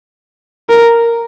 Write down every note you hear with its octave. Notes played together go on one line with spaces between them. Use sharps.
A#4